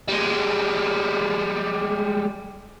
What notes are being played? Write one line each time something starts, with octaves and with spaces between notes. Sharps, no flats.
G3 G#3